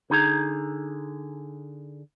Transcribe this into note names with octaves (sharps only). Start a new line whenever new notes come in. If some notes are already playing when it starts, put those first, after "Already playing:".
D3 D#4 G#4 A#5